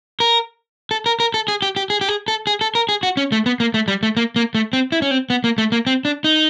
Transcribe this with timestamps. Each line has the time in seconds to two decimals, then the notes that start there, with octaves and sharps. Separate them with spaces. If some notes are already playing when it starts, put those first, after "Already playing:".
0.20 A#4
0.91 A4
1.06 A#4
1.20 A#4
1.34 A4
1.48 G#4
1.62 G4
1.76 G4
1.90 G#4
2.01 G4
2.08 G#4
2.28 A4
2.47 G#4
2.61 A4
2.75 A#4
2.89 G#4
3.03 F#4
3.17 C#4
3.32 A3
3.46 B3
3.60 A#3
3.74 A3
3.88 G3
4.03 A3
4.17 A#3
4.36 A#3
4.55 A3
4.73 C4
4.92 E4
5.02 C#4
5.11 C4
5.30 B3
5.44 A#3
5.58 A3
5.72 A#3
5.87 C4
6.05 D4
6.24 D#4